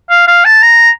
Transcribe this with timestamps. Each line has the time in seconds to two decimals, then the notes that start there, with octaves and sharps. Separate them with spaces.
0.10 F5
0.28 F5
0.45 A5
0.63 A#5